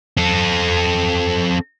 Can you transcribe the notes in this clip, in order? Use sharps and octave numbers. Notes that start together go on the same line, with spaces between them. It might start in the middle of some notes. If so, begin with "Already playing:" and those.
C4 A4